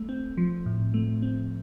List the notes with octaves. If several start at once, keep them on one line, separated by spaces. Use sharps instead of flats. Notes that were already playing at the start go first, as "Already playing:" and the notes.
Already playing: A3
C4
F3
A2
A3
C4